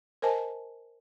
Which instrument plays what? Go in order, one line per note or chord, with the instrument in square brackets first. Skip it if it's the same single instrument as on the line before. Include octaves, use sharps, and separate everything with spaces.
[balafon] A#4 C5 D#5 G#5 A5